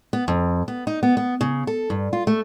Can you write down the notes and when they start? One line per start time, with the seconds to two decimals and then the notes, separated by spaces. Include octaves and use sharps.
0.13 B3
0.28 F2
0.68 B3
0.87 D#4
1.03 B3
1.17 B3
1.41 C#3
1.67 A4
1.90 G2
2.13 F4
2.27 A3